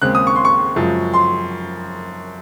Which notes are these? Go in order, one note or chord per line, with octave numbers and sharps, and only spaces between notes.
D#2 C#3 G#3 C4 F#6
D#6
C#6
C6
C#6
F#2 C#3 F3 G#3
C6